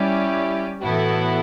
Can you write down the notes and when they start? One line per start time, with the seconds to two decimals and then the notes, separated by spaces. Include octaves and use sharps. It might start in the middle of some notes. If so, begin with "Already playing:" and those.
Already playing: G3 C#4 E4 G4 D5
0.82 A2 E3 B3 E4 F#4 A4